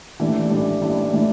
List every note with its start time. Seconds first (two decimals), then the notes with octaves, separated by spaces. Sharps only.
0.20 A1 A2 E3 D4
0.50 A1 A2 E3 D4
0.81 A1 A2 E3 D4
1.13 A2 E3 D4